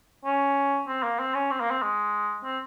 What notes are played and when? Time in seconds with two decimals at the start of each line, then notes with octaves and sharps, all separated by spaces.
0.25 C#4
0.88 C4
1.03 A#3
1.19 C4
1.35 C#4
1.51 C4
1.60 A#3
1.71 C4
1.82 G#3
2.44 C4